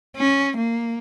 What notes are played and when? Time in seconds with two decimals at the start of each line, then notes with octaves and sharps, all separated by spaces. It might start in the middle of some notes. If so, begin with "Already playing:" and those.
0.16 C#4
0.57 A#3